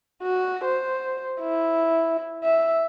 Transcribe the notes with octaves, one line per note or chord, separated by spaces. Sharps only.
F#4
C5
E4
E5